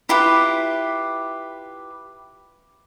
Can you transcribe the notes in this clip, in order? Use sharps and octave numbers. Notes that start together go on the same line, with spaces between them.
E4 F4 G4 B4